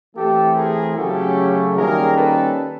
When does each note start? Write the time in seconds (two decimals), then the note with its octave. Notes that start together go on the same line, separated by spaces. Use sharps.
0.16 E3 A3 C4 G4 A4
0.56 G#4 A#4
0.96 C#3 F#3 A3 C#4 G4 A4
1.76 D#3 G3 A#3 C#4 G#4 A#4
2.17 A4 B4